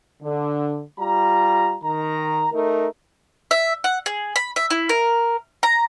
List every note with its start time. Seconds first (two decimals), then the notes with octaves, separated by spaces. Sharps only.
0.22 D3
0.99 G3 F4 A#5
1.83 D#3 A#5
2.52 A3 D#4 A#4
3.51 E5
3.84 F#5
4.06 G#4
4.36 B5
4.56 E5
4.70 E4
4.89 A#4
5.63 A#5